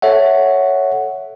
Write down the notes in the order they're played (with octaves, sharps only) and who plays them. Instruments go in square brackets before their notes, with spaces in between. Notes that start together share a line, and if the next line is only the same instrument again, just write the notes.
[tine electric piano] A4 C#5 E5 F#5